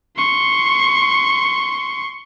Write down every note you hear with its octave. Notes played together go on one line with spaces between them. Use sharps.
C6 C#6